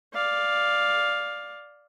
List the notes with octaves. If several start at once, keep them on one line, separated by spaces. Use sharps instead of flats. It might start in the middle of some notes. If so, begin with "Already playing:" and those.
D5 F5